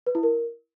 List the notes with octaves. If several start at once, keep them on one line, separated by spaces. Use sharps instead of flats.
B4
E4
A#4